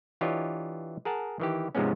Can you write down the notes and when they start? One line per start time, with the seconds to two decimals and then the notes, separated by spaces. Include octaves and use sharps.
0.21 E3 D4 F4 G4 C#5 D#5
1.05 G#4 A#4 F#5 A5
1.40 D#3 E3 G4
1.75 G#2 C3 F3 G#3 B3 C#4